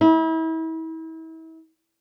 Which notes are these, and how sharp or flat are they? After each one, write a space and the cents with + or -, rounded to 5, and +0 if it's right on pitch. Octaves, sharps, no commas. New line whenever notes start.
E4 -35